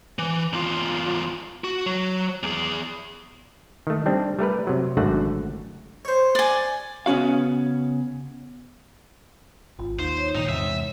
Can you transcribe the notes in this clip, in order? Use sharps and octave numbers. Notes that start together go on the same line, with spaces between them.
E3
E2 F4
F#4
F#3
E2 G#4
D#3 A3
G3 C4 D4
G3 A3 A#4 B4
C3 F#3
G#1 F#2 D3 A3 F#4 F#5
C5 C#5
D5 G#5
C#3 B3 C#4 F#4 F5
G#1 F4
D#2 D#4 C5
C#5
G2 A#2 D#3 D#4
E2 G#2 C3 C#5 E5